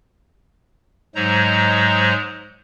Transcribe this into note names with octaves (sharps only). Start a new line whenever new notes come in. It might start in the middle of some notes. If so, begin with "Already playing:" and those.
G#2 F#3 G#3 C5 A#5